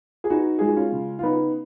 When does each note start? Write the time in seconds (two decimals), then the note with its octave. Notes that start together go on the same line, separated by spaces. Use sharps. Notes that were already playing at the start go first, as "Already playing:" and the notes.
0.24 G#4
0.30 B3 D#4 F#4
0.59 G#3 G#4
0.67 F#4
0.76 C#4 F4
0.92 C#3
1.19 F4
1.23 B3 D#4